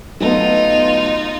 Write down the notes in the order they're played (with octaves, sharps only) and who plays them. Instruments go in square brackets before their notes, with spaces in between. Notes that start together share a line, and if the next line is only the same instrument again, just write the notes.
[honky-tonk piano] F#3 A3 B3 [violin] D#4 F4